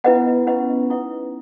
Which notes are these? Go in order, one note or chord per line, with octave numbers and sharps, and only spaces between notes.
B3 E4 B4 D#5 F#5
C#4 E4 B4 D#5 F#5
D#4 E4 B4 D#5 F#5